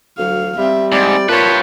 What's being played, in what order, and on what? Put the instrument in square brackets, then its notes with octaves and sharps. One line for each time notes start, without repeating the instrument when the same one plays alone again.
[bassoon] D2 [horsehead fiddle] F#3 F5
[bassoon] G3 [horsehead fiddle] C4 [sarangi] E5
[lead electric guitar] G#2 [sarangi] C4 [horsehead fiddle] D5
[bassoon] A#2 [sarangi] F4 [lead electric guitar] G4 B4 [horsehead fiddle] C#5 A5